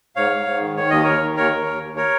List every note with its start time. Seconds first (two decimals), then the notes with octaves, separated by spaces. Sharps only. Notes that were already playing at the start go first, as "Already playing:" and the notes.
0.16 G#2 C#5 F5
0.31 G#2
0.46 G#2
0.61 D#3
0.76 D#3 C#5
0.90 D#2 D#5
1.04 D#2 A#4 C#5
1.22 D#3
1.37 D#2 A#4 C#5
1.52 D#2
1.67 D#2
1.82 D#2
1.96 A#4 C#5